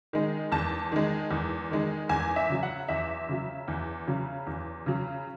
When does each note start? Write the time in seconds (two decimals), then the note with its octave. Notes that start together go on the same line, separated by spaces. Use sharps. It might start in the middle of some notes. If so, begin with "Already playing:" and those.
0.13 D#3 G#3
0.52 E2 A5
0.92 D#3 G#3
1.31 E2
1.71 D#3 G#3
2.09 E2 G#5
2.36 E5
2.50 C#3 F#3
2.63 F#5
2.88 E2 E5
3.29 C#3 F#3
3.68 E2
4.07 C#3 F#3
4.47 E2
4.86 C#3 F#3